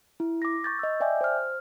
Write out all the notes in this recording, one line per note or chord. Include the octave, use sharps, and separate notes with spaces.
E4
D6 A#6
C#6 G6 A6
D#5 E6
D5 E5 G5 G#5 D6 G6
C5 F6